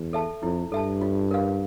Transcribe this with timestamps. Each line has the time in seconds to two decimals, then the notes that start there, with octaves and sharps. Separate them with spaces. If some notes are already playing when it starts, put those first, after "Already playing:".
Already playing: E2
0.13 A4 E5 A5
0.43 F2 E4
0.72 G2 A4 E5 A5
1.01 F4
1.31 A#4 F5